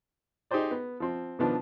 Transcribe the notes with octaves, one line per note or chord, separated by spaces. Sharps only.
D#4 G4 G#4 C5 D5
B3
F3 C4
B2 D#3 F3 B3 D4